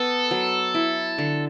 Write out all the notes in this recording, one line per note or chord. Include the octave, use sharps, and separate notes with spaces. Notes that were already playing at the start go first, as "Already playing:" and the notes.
Already playing: B3 A4
F#3
E4
D3